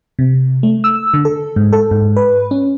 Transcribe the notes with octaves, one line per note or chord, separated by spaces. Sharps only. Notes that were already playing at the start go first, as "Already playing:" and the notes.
C3
A3
E6
D3
A4
G#2
A4
G#2
B4
C#4